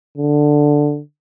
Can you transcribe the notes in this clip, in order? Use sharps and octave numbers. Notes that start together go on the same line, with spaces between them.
D3